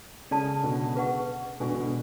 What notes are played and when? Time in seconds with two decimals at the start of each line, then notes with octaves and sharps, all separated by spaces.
0.31 C#3 D4 A4 D5 A5
0.63 B2 D3
0.95 G#4 B4 F#5 C#6
1.60 B2 D3 B4 D5 G#5 C#6
1.71 B2 D3
1.82 B2 D3